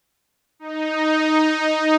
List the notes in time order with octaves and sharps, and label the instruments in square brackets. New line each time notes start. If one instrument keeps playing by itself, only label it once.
[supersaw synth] D#4